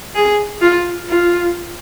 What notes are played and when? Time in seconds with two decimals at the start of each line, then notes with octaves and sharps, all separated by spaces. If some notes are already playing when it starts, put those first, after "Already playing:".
0.15 G#4
0.61 F4
1.09 F4